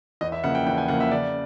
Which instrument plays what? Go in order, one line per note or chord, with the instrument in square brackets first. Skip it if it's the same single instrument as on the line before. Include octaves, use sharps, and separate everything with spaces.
[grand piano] E2 D#5
E5
C#3 F3 A#3 F#5
G5
E2 G5
G#5
C#3 F3 A#3 F#5
E5
C#3 D5